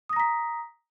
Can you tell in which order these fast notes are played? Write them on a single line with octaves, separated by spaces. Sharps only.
D#6 A#6 A#5 B6